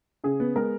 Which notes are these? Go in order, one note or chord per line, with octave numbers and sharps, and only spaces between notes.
C#3 G#4
B3
G#3 A#4